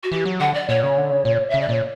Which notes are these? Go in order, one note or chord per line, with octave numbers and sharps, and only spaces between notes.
F#4
E3 G4
F#3
D3 F#5
D5
A#2 C#5
C#3
D3
C#3
A#2
C#3 E5
D5
A#2 C#5